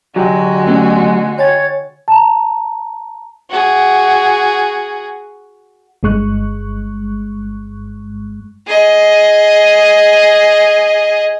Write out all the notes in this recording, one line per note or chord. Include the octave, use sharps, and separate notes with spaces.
D3 F#3 G#3 F#4 G4 F#5
A3 B3 C#4
C#5 G5 G#5 A6
A5 A#5
F#4 G#4
G1 G2 G#3 C#6 F#6
G#4 D#5